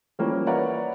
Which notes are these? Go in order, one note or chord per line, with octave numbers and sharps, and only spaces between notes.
E3 F3 G3 A#3 C#4
B4 C#5 D5 E5 F#5 A#5